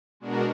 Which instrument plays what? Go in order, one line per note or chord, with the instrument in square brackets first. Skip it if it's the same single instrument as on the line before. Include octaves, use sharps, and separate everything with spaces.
[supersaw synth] B2 G#3 D4 F#4 A#4